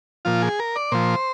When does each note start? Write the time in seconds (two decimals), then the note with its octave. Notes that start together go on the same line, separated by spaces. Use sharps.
0.25 A#2 F3 F4
0.42 G#4
0.59 A#4
0.76 D5
0.92 A#2 F3 C5